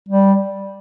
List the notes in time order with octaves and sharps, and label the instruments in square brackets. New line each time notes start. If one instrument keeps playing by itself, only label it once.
[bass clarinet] G3